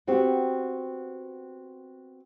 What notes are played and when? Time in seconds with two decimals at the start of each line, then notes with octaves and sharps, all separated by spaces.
0.07 B3 C4 F#4 G4